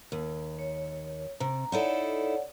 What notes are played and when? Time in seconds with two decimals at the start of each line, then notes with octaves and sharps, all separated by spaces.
0.12 D#2
0.59 C#5
1.40 C3 A#5
1.72 D#4 E4 A4 C#5 D5 F#5